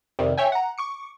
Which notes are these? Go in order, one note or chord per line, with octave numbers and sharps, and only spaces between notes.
F2 C3 D#3 G3
C#5 E5 G5 G#5
F#5 A#5
C#6 D6 C#7